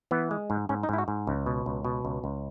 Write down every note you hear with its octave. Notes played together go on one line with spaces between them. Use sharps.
E3 B3
G#3
G#2
G#2 C#4
D#4
G#2 E4
F#4
G#2
C#2
B2
C#2
B2
C#2
C#2